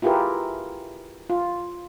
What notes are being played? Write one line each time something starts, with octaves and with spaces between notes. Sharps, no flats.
E4 F4 G4 G#4 A#4 B4
F4